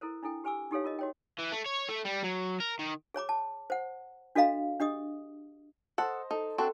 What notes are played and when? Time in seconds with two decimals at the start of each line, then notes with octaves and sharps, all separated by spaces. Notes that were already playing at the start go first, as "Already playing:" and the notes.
0.01 E4 A4 A#4 C5
0.23 D4 E4 A4 G5
0.44 G4 B4 G#5 D6 E6
0.71 D#4 G4 A4 C#5 F5
0.84 F4 A#4 D#5
0.99 F#4 C#5 G5
1.39 E3
1.52 A3
1.66 C#5
1.89 A3
2.05 G3
2.23 F#3
2.60 A#4
2.79 D#3
3.14 G#4 C#5 A#5 D6
3.29 A5
3.70 C5 F#5
4.35 D4 F#4 A4 D#5 F5 A#5
4.80 D4 G4 D#5 D#6
5.98 A4 C5 D#5 F#5
6.31 D#4 A4
6.58 C4 D4 F#4 A4